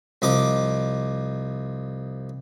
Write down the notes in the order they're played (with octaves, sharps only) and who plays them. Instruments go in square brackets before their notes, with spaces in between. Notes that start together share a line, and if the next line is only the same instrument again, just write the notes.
[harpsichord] C2 F3 D#5 D6